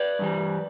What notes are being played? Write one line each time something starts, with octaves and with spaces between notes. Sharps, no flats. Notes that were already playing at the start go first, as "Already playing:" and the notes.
Already playing: B4 D5
G2 E3 G3